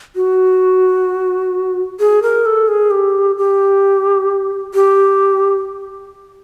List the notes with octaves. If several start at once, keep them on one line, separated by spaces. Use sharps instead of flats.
F#4
G#4
A#4
A4
G#4
G4
G4
G4